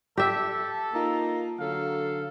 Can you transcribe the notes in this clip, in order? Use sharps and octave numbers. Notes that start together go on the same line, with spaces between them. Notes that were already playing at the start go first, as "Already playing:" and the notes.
G4 A4 E5
A#3 D#4 F4
D3 F#3 A4 F5